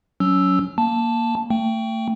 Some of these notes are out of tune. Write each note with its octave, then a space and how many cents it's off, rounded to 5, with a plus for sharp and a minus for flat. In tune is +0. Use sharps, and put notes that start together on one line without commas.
F#3 +0 C#4 +25 E6 +0
A#3 +0 A5 +0
A3 +35 G5 +0